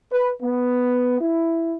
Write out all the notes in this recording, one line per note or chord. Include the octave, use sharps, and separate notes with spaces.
B4
B3
E4